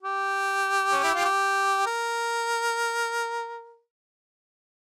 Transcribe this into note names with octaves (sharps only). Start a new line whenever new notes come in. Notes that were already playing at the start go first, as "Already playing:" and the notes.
G4
C#4
E4
F4
G4
A#4